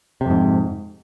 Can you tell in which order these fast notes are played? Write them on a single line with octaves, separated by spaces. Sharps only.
C3 F2 G#2